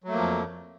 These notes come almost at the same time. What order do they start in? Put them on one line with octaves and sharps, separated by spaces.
F#3 A3 A#3 F3 F2